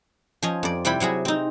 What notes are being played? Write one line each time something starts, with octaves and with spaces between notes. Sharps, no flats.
F3 C#4 D#5
F2 D5
C3 G3 E4 G5 B5
C3 F#3 E4 G#4
C4 D#4